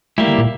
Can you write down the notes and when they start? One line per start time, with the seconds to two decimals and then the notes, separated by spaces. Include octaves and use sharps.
0.18 G3 A3 A#3 E4 G4
0.28 D3
0.38 A#2